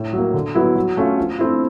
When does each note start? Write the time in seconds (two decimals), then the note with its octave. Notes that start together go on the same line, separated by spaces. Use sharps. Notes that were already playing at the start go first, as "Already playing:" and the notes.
Already playing: A2
0.13 F#3 A#3
0.34 D3
0.55 F#3 B3 E4
0.75 F#3
0.97 A3 C#4 F4
1.18 F3
1.39 A3 C4 E4